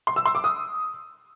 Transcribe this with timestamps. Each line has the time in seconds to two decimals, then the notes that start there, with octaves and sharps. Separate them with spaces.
0.07 C6
0.16 E6
0.26 C6
0.35 D6
0.44 D#6